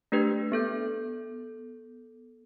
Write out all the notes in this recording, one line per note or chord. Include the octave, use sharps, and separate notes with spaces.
A3 D4 G4 B4
B3 A4 G6